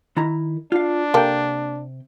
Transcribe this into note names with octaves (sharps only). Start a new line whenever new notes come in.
D#3 E4 A#5
D4 F4 F5
C3 A#3 G4 A4 G5